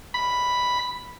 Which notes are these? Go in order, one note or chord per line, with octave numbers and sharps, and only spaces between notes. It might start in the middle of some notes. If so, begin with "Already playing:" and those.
B5